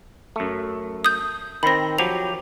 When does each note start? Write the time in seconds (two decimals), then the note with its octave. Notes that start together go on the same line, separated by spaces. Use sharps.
0.36 F#2 A3
1.05 D#6 G6
1.63 D#3 C4 B5 A#6
1.98 F3 F#3 G4 F7